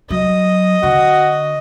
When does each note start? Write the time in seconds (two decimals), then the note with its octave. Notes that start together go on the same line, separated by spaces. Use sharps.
0.10 F#3 D#5
0.83 D3 F#4